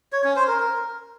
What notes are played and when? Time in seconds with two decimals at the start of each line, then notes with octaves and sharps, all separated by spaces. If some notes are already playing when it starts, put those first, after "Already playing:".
0.12 C#5
0.24 C#4
0.36 C5
0.48 A#4
0.59 A#4